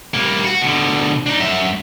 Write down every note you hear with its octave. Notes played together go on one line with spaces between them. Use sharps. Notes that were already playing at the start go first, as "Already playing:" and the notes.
G3 A#3
F#4
B2 D3
D4 D#4
F#2 E5